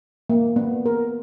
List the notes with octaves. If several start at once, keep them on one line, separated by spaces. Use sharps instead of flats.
A#3
B3
A#4